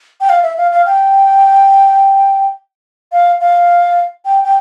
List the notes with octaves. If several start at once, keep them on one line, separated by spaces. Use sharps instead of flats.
G5
F5
E5
F5
F5
G5
F5
F5
G5
G5